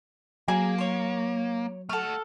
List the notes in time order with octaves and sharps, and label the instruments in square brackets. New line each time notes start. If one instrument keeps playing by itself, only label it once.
[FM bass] F#3 [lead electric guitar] A#3 [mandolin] G#4
[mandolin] C#5 C6
[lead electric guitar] A3 F#5 [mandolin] A4 F6